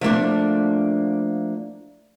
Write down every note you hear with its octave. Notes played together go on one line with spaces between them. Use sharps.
F3 A3 A#3 D4